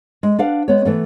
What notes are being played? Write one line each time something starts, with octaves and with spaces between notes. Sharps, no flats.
G#3
D4 B4 F5 F#5
G#3 B3 C#5
E3 A3 B3